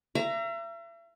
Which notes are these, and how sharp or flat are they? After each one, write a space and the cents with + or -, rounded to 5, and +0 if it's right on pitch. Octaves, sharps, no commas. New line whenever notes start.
E5 +40 A#5 +0